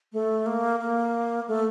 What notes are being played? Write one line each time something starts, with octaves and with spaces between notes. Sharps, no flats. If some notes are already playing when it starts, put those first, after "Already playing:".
A3
A#3
A#3
A3